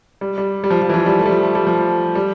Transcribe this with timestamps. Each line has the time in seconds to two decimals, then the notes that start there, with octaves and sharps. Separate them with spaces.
0.21 G3
0.38 G3
0.64 G3
0.71 F3
0.82 F3
0.89 E3
0.94 F3
1.06 G3
1.19 A3
1.26 G3
1.30 F3
1.43 A3
1.55 G3
1.67 F3
2.15 G3